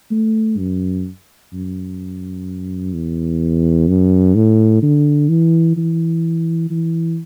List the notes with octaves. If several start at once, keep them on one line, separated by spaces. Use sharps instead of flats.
A3
F#2
F#2
E2
F#2
A2
D3
E3
E3
E3